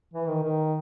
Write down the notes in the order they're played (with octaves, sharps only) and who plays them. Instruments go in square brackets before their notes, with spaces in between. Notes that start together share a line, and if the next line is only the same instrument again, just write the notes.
[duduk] E3
D#3
D#3